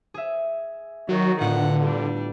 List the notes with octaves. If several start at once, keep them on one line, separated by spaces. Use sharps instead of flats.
G#4 E5
D#3 F#3 F#4
A2 D3 B3 F4 F#5
G3 D4